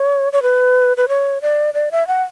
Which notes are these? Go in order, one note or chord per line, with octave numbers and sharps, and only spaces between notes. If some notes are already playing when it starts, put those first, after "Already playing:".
Already playing: C#5
C#5
B4
B4
C#5
D5
D5
E5
F#5